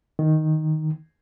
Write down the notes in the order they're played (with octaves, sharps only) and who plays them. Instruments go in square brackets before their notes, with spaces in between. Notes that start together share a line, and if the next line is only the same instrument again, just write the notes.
[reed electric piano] D#3